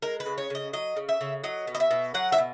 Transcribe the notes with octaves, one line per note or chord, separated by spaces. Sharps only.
G#3 A#4
B4
C#3
C#5
C#3 D#5
F#3 D#5
C#3
E5
C#3
F#3 D#5
B2
D#5
E5
B2
F#3 F#5
E5
B2